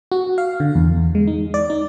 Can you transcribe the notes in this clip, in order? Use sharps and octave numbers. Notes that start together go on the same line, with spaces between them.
F#4
F5
D3
E2
E2
G#3
D#4
D5
D#4